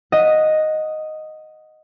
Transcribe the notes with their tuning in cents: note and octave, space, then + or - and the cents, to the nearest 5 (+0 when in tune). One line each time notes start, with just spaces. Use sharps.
D#5 +0 F#5 -10